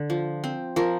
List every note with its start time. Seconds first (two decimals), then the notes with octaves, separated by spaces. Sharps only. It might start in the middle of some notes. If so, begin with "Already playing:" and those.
Already playing: D3
0.10 F3
0.44 C4
0.76 F3 A#4